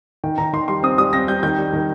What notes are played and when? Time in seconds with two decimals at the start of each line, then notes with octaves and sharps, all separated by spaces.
0.24 D#3 G5
0.38 D#3 A#5
0.53 D#3 C6
0.68 G3 C6
0.83 C4 D#6
0.98 G3 D#6
1.13 C4 A#6
1.28 G3 G6
1.43 D#3 G6
1.58 G3
1.73 D#3